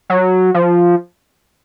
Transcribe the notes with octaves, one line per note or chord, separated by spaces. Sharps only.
F#3
F3